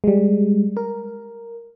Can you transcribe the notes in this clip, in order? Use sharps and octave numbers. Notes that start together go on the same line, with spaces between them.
G3 G#3
A#4